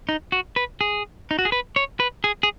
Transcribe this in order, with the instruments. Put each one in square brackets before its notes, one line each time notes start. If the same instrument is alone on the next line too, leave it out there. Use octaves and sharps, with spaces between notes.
[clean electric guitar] D#4
F#4
B4
G#4
D#4
F#4
G#4
B4
C#5
B4
G#4
G#4